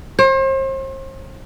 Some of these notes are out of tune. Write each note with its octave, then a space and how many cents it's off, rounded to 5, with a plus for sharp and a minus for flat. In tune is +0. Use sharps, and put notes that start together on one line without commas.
C5 +40